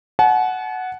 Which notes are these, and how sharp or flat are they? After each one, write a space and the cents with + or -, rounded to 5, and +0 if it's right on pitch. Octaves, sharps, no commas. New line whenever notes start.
F#5 +0 A5 -45